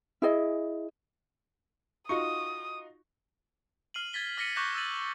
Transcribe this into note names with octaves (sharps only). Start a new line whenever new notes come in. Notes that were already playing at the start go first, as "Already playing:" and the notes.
E4 G#4 D#5
D#4 F4 F#4 C#6 D#6
F6 C7 D#7 F#7
G#6 A6 B6 G7
D6 F6 A#6 B6 C#7 D#7
C#6 D6 F#6 G6 A#6
E6 G6 A6 D#7 F#7